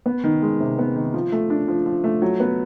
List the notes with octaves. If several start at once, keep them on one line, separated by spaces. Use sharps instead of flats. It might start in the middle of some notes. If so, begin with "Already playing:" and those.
B3
D#3
G#3
C3
B3
D#3
F3
A3
D4
F3
F3
A3
F#3
B3